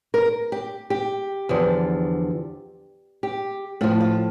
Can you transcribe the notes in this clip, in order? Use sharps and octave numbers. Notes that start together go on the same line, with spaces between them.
A#4
G4
G4
E2 D3 F3
G4
A2 F3 F4
F4